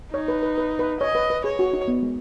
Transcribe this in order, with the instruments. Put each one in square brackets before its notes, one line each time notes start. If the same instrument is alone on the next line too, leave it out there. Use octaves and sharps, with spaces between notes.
[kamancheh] D#4 [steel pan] C#5
[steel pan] B4
B4
B4
B4
[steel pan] C#5 [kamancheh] D#5
[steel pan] B4
B4
[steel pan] G#4 [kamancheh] C#5
[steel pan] F#4
D#4
B3
G#3